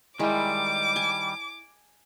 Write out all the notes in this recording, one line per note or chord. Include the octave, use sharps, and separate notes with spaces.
D#3 G3 G#3 E4 D6
G#5 A5